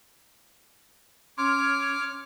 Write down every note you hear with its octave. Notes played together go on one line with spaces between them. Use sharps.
C#4 C#5 C6 D6 F6